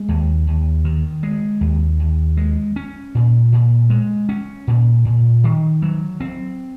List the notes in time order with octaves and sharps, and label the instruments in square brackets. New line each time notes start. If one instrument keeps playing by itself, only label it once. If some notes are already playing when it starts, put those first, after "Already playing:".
Already playing: [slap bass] G#3
D#2
D#2
D#3
G#3
D#2
D#2
G#3
C#4
A#2
A#2
G#3
C#4
A#2
A#2
D#3
F#3
C4